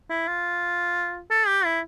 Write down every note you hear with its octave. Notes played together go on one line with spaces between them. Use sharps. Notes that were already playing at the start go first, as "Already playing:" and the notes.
E4
F4
A4
G4
E4